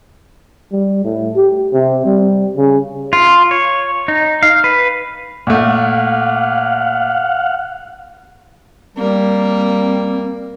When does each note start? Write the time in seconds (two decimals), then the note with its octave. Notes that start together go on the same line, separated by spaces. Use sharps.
0.72 G3
1.04 A2
1.36 G4
1.73 C3
2.05 G3
2.57 C#3
3.13 F4
3.51 C#5
4.08 D#4
4.43 F5
4.64 B4
5.47 A#2 A3 F5 F#5
8.97 G3 A#3 C4